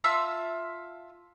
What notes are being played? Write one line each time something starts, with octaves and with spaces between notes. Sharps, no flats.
F4 E5 A5 E6